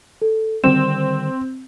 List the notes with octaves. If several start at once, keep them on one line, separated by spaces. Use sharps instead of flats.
A4
D3 D#3 G3 C4 E7